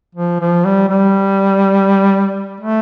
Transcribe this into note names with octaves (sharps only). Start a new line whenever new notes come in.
F3
F3
G3
G3
A3